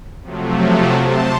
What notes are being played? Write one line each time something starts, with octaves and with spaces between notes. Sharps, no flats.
C3 F3 F#3 A3
C3 C5 A5